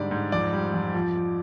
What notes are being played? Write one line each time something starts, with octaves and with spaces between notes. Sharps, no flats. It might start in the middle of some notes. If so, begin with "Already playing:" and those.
Already playing: G#2 D3 G3 D5
G#2
F2 D5
G3
F2
F3
F3